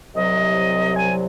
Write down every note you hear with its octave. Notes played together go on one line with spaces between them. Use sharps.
C2 C3 F#3 D#5
G#5